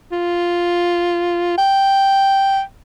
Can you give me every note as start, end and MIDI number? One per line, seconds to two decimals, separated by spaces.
0.12 1.57 65
1.58 2.61 79